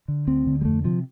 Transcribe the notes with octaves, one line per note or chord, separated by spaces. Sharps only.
D3
D2 C4
D3
G3
F2 A3
C3 F3